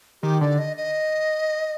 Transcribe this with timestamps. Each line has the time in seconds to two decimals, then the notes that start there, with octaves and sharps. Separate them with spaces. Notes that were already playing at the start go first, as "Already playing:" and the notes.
0.22 D#3 G4
0.41 D3 D5
0.58 D#5
0.76 D#5